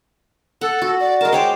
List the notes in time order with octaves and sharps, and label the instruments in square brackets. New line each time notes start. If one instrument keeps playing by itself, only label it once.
[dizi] A4 [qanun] F#5
[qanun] F#4
[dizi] D5
[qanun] G#3 A5 [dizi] A#4
[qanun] C5 C#5 D6 [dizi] G5